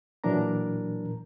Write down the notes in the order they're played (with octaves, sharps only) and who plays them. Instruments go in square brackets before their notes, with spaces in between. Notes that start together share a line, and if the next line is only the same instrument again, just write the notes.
[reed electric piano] A#2 E3 F#3 D4 A#4 A#5